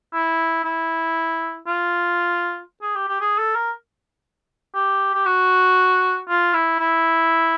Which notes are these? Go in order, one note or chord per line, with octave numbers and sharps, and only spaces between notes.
E4
E4
F4
G#4
G4
G4
G#4
A4
A#4
G4
G4
F#4
F4
E4
E4